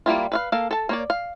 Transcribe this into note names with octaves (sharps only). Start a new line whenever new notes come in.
G3 A#3 E4 F4
B4 E5 F5
A#3 A4 F5
A4 A5
A#3 C#5 D5
F5